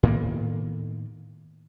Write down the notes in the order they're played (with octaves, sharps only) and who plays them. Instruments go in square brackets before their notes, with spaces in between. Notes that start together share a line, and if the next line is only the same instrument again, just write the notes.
[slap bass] A2 D#3 A#3 B3